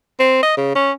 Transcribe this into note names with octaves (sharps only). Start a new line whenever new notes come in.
C4
D#5
C#3
C#4